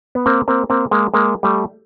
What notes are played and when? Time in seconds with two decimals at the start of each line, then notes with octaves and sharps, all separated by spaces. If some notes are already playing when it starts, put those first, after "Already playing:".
0.15 B3
0.26 A#3 C4
0.48 A#3 C4
0.70 A#3 C4
0.91 G#3 A#3
1.14 G#3 A#3
1.43 G3 A3